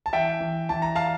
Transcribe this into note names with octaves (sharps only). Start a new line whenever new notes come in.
A5
E3 E5 G5
E3
E3 A5
A#5
F5 A5